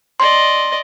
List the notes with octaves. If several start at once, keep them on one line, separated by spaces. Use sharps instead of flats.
D5 D#5 C6